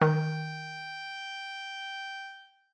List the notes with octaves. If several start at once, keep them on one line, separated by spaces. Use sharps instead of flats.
D#3 G5